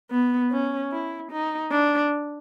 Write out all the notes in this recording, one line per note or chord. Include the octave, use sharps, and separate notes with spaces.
B3
C#4
E4
D#4
D4